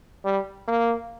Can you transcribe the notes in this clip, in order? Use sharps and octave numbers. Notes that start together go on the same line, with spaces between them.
G3
A#3